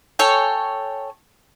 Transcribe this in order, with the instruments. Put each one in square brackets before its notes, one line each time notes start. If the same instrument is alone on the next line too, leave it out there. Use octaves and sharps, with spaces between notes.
[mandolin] A4 C#5 G5 G#5